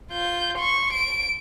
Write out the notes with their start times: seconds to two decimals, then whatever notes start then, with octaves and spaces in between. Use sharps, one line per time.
0.12 F4 G6
0.58 C6 C#6
0.93 D7